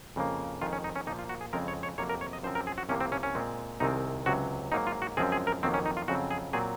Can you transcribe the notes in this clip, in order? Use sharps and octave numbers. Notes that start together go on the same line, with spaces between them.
F2 C#3 F3 A#3
F2 D#3 G#3 F4
C#4
D#4
C#4
A#2 F3 A#3 D#4
F4
F#4
G#4
F2 C#3 G#3 C4 A#4
C#5
C#5
F2 C3 F#3 A#3 C#5
A#4
C#5
D#5
F#2 F3 C4 C5
A#4
G#4
F#4
C2 C3 F3 A#3 C#4
C4
C#4
C#4
A#2 G#3 C4
C2 C3 D#3 G#3 C4 D#4
C#2 C3 F#3 F#4
G#2 F#3 A#3 D#4
F4
F#4
F#2 F3 G#3 C4 G#4
G#4
A#4
F2 D#3 F#3 A#3 C4
C#4
D#4
F4
F2 C#3 F#3 C4 F#4
G#4
A#2 F#3 C4 G#4